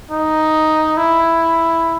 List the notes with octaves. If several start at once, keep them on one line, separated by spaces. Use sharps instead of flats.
D#4
E4